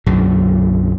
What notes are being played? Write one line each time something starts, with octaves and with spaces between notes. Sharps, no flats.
B1 F#2 A#2 D3